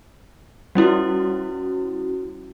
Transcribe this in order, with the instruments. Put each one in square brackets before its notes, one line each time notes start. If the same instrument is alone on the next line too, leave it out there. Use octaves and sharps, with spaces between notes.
[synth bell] G3 C#4 E4 F#4